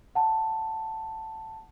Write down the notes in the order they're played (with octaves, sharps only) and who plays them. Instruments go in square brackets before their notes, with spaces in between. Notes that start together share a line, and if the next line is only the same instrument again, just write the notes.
[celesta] F#5 A5